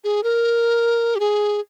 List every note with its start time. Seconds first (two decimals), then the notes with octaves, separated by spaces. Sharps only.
0.04 G#4
0.23 A#4
1.16 G4
1.20 G#4